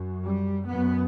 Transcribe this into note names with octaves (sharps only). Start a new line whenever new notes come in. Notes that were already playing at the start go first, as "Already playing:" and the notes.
Already playing: F#2
G3
F#2 B3